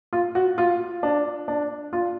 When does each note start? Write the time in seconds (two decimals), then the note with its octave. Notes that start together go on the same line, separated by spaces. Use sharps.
0.13 F4
0.35 F#4
0.58 F4
1.03 D4
1.48 D4
1.93 F4